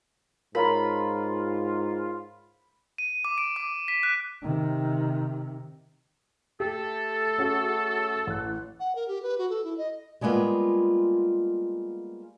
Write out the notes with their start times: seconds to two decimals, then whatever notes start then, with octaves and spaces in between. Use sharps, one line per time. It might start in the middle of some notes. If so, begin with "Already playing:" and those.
0.55 G#2 F4 A#4 C#5 A#5 B5
2.98 D#7
3.25 D6
3.38 D7
3.56 D6
3.88 B6
4.03 F#6
4.43 C3 D#3
6.60 A3 G4 A4
7.38 C#4 F#4 G#4
8.27 A1 F#6
8.80 F#5
8.95 A#4
9.08 G4
9.22 B4
9.38 F#4
9.50 A4
9.64 E4
9.78 D#5
10.21 G3 G#3 A#3 B3 F4